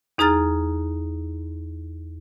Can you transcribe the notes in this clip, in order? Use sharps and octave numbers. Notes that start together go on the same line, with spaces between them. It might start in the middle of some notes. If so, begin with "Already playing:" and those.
E2 D#4 G#4 A#5 F6 A6